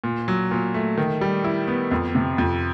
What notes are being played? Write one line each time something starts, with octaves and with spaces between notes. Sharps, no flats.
A#2
F#3
A#2
A3
D#3
G3
E4
B3
F2
C3
F2